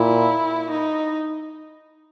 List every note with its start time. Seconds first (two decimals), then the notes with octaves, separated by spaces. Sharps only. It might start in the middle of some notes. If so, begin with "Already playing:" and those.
Already playing: A#2 E4
0.71 D#4